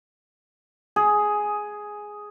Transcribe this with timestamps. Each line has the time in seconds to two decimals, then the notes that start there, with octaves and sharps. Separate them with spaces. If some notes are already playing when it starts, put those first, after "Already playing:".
0.96 G#4